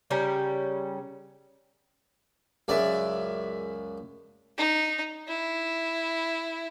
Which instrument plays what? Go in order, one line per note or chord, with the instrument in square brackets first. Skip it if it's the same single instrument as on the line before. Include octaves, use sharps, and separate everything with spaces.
[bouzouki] C#3 G3 C#4 A#4
[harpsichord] C#2 F#2 D5 [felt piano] G#4 E5
[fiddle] D#4
E4